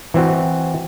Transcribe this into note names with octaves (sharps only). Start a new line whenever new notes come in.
E3 C4 F#4